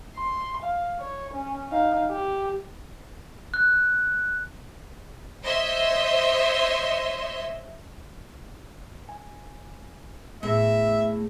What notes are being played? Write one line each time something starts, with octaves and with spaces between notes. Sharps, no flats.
C6
F5
C#5
C#4
D#4 F5
G4
F#6
C5 C#5 D#5 E5 C6
G#5
A2 B3 G#4 E5 A#6